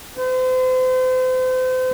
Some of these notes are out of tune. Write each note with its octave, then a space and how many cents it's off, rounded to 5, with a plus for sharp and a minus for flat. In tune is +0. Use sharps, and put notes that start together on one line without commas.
C5 -35